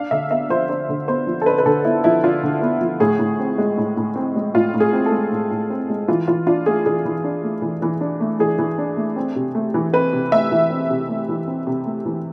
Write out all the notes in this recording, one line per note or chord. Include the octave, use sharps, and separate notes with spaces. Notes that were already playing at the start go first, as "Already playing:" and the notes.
Already playing: D4 F5
D3 E5
B3 E5
F3 C5
D4 C5
D3
B3 C5
F3
A4
D4 B4
B4
D3 A4
B3 E4
F3 E4
D4 F4
D3
B3
F3
A2 G#4
A2
C4
G#3
A2
A2
C4
G#3
A2 F4
A2
G#4
C4
A4
G#3
A2
A2
C4
G#3
E3 F4
E3 F4
D4 F4
A3 G#4
E3 G#4
E3
D4
A3
E3
E3
D4
A3
E3 G#4
E3
D4
A3
C4
C3
A3
E3
C4 B4
C3
A3 E5
E3
C4
C3
A3
E3
C4
C3
A3
E3